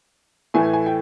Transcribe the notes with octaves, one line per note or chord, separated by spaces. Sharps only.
A2 E3 A3 G#5
G#5
G5